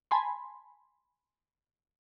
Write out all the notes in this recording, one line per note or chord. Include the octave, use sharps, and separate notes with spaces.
G#5 A5 B5 C6